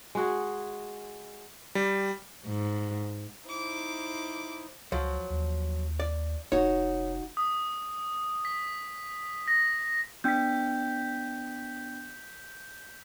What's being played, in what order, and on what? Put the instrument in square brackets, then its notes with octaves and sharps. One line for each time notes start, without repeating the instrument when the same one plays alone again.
[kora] G#3 F#4 G#4
[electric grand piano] G3
[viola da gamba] G#2
[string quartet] D#4 E4 C5 [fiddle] D6
[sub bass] C#2 [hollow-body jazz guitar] F3 F#3
[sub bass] D#2
[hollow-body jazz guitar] D5
[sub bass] F1 [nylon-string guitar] D#4 F#4 [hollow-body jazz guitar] C#5
[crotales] D#6
B6
A#6
[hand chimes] B3 D4 G5 [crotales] G6 B6